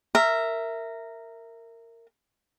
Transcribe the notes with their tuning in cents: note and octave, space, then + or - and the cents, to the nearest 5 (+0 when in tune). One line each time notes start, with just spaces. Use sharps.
A#4 -15 E5 +0